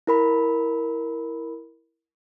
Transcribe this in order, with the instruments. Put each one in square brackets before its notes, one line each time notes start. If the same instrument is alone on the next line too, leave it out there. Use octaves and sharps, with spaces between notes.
[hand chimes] E4 A#4 B5